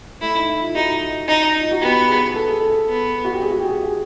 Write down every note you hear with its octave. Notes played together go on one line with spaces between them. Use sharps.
A3 E4
D#4
E4
F4
D#4 F#4
D#4
F4
F#4
B3 G4
G#4
A4
G#4
A4
B3
F#4
G4
G#4
F#4
G4
G#4
G#4